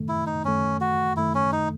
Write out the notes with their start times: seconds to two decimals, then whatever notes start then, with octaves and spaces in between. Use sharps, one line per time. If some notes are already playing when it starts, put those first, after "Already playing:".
Already playing: F#2 D#3 A3
0.08 E4
0.26 D#4
0.44 F#2 D#3 A3 C#4
0.81 F#4
1.17 F#2 D#3 A3 E4
1.35 C#4
1.52 D#4